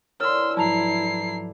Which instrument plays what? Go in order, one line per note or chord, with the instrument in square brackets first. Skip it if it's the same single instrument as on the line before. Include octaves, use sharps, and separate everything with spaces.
[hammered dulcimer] D3 E3 D5 [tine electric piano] A#4 [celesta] C#5 F6 [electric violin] C6 E6
[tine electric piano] G#2 F3 F#3 [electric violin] E4 C7 [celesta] A5 A#5 F7